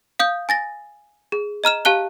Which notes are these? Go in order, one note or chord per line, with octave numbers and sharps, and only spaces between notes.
F5 D#6 G6
G#5 A6 A#6
G#4
D#5 A#5 F6 E7
G4 F5 A5 F#6 G7